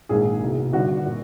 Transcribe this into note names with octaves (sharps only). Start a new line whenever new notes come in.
A#1 G#2 D#3 G#4
C2 B2
G1 G2 D#3 F#4
A#2